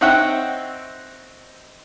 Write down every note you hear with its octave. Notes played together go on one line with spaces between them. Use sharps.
C4 D#4 C#5 E5 F#5 G5